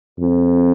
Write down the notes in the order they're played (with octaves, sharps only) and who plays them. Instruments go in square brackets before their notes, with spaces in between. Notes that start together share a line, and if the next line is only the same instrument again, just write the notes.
[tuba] F2